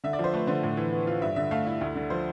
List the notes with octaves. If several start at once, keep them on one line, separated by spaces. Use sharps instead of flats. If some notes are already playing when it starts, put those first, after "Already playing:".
D3 E5
D5
F3
C5
A3 B4
D3 C5
A2
E3
B3
F4
G2 E5
D3 E5
A3 F5
E4
D2
D3
F3 C5